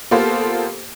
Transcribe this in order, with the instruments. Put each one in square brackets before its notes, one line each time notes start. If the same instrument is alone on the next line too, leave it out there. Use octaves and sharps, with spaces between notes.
[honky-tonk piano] A#3 B3 F4 G4 A4 C5